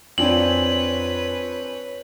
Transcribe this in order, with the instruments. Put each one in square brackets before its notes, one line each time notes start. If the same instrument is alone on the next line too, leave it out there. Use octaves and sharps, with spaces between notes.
[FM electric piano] F2 F4 G#5 [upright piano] C4 D4 [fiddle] B4 C#5 [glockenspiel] F#7